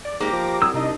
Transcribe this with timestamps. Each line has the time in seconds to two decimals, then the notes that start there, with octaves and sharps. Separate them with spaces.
0.05 D5
0.20 G#2 A#3 G4 D6 A#6
0.32 F3
0.62 C2 F#3 D#6 E6
0.74 C3 D4 D#4 D#5